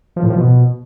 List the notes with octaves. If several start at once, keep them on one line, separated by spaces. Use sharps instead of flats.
F3
A2
F3
B2